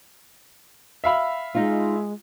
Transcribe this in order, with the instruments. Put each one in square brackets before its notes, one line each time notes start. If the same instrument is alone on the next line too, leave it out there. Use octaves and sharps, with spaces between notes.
[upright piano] E5 F5 B5
[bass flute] G#3 [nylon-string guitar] D#4 F4